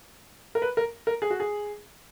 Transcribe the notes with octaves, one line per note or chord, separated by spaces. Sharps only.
A#4
B4
A#4
A#4
G#4
F#4
G#4